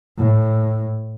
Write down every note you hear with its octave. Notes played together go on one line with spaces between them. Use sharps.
A2